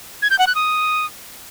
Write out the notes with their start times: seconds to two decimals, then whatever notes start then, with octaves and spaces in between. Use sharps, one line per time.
0.22 G#6
0.31 G6
0.39 F#5
0.47 F#6
0.55 D#6